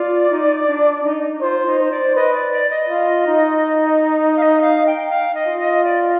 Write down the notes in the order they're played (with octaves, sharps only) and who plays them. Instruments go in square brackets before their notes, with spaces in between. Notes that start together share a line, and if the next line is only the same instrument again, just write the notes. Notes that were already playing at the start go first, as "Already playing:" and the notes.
Already playing: [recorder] F4 [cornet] D5
[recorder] D#4
D4
D#4
[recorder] F4 [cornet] C5
[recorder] D#4
[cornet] C5
[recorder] D5
[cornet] B4 [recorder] D#5
[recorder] D5
D5
D#5
[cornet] F4
D#4
[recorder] F5
D#5
F5
G5
F5
D#5
[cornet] F4
[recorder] D#5
D5